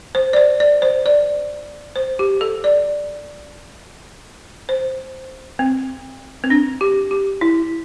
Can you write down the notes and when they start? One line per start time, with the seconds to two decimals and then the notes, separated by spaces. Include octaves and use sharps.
0.15 C5
0.33 D5
0.37 C5
0.60 D5
0.82 C5
1.06 D5
1.96 C5
2.19 G4
2.41 A4
2.64 D5
4.69 C5
5.59 C4
6.44 C4
6.50 D4
6.81 G4
7.11 G4
7.41 E4